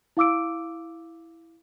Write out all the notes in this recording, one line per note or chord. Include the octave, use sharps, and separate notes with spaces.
E4 F5 D6 E6 D7